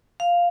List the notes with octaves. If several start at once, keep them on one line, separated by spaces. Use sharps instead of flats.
F5